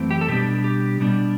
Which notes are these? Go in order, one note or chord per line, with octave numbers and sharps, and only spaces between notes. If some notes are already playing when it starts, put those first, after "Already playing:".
Already playing: F#2 E3 A3 C4
G4
A4
B2 G3 B3 D4 G4
G4
B2 G3 B3 D4